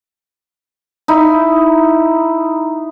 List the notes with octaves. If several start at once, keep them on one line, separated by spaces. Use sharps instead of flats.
D#4 E4